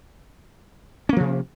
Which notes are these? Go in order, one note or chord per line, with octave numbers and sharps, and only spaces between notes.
C3 F3 A#3 C#4